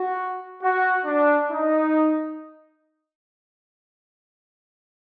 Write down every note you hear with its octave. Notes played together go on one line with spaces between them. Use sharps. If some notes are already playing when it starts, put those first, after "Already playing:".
Already playing: F#4
F#4
D4
D#4